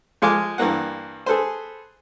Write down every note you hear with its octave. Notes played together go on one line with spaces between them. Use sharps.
F3 G#3 F4 G#5 D6
G2 E3 A#3 F#5
G#4 A4 B4 C5